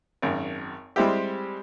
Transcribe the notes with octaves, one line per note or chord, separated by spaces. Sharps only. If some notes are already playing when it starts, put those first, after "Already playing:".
G#1 F#2
G3 G#3 C4 E4 G4